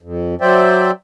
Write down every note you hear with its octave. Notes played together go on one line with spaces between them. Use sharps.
F2
F#3 C5 D5 E5 G5